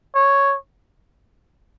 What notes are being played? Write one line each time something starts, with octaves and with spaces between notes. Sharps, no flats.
C#5